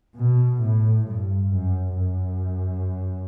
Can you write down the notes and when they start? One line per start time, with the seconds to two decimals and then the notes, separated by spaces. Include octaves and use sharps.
0.16 B2
0.61 A2
1.07 G2
1.52 F#2
1.96 F#2